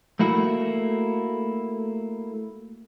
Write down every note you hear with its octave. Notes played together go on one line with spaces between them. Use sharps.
A3 A#3 E4 F#4